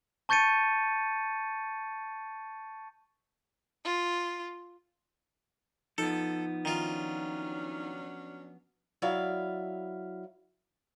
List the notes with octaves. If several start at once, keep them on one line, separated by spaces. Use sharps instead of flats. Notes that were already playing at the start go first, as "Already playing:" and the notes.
A5 C#6 G6 A6 C#7 D#7
F4
F3 B3 D#4 A4
D#3 F#3 C#4 D4 F4
F#3 E4 D5 E5 F5